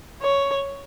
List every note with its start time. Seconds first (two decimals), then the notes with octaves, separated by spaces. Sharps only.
0.22 C#5